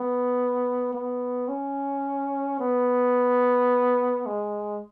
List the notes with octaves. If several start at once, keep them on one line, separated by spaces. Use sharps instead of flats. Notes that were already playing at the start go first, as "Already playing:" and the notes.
Already playing: B3
B3
C#4
B3
G#3